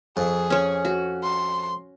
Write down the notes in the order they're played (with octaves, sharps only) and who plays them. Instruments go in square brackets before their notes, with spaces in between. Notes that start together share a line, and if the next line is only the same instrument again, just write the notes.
[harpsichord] F2 [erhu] G#4
[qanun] C#4 C#5
F#4
[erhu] C6